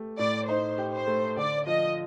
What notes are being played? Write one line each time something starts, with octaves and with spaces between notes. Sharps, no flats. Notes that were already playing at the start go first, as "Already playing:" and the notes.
Already playing: A3 G4
A2 D5
D#4 C5
G4
C5
A3
D3 D5
F3 D#5